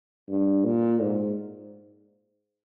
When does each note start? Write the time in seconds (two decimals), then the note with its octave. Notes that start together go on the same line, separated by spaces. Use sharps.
0.29 G2
0.65 A#2
1.01 G#2